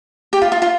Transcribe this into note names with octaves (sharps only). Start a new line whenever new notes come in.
G4
F4
F4
F4